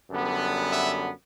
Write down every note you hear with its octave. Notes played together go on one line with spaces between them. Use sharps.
F#2 D3 G3 B3
E5